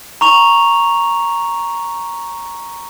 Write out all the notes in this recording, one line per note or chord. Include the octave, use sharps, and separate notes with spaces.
A#5 C#6 F7